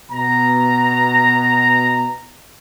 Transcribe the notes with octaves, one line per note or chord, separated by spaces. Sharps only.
B2 A#5